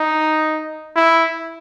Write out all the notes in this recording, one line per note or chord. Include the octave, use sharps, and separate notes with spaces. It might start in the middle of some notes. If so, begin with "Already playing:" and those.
Already playing: D#4
E4